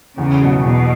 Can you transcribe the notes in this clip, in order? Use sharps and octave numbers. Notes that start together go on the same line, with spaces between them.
E2 C#3
B2 F#3
E2 B2